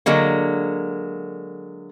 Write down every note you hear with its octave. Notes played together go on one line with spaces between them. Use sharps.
D3 F#3 G#3 A#3